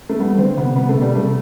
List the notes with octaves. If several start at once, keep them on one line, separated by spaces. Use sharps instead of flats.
A3
G3 B3
D3 C4
C3 B3
D3
C3 B3
A3
B2
G3
C3 A3